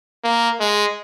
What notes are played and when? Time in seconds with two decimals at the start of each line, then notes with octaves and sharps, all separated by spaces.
0.24 A#3
0.60 G#3